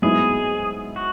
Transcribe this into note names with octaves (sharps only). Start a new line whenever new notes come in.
G#2 F#3 B3 E4 G#4
F#4